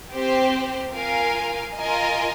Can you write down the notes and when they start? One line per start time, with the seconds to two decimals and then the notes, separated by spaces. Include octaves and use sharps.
0.12 C4 G4 C5
0.93 F4 A#4 F5 G#5
1.76 F4 A#4 D#5 G#5